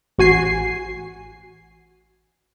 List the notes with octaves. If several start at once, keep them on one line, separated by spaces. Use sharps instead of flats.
A1 F#4 G#5 C7